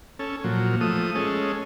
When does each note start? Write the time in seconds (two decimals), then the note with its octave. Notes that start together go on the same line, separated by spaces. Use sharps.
0.19 C#4 A4
0.44 A#2 F3 F#3
0.81 F3 A3 D#6
1.15 G#3 C#4 A4